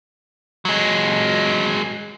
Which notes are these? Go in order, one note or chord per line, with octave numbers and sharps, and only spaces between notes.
F#3 G#3